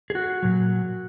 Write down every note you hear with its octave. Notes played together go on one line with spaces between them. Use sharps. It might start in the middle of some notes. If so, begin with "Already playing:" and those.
G#4
F#4
A#2 F#3